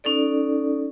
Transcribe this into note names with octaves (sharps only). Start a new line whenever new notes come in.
C#4 D#4 A4 D5